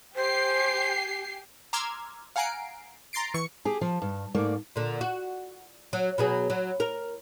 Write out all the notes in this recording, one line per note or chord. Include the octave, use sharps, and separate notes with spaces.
G4 C5 G#5 C7
A#5 C6 D6 E6 F6 G#6
F5 F#5 G#5 A#5 C7 D7
A#5 C6 A6 C7 D7
E3 C#6 C#7
G4 G#4
F3
G2
G#2 A3 A#3 D5
A#2 D3
F#4
F#3
B2 F#3 G#4
F#3
A#4